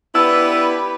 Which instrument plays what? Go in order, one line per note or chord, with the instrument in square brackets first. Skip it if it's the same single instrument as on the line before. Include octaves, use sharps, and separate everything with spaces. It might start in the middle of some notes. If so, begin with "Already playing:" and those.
[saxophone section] B3 D4 E4 [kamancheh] G4 B4 [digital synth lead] E6